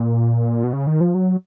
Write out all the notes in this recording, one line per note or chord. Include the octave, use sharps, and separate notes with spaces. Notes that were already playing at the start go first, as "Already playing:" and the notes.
Already playing: A#2
B2
C#3
D#3
F3
F#3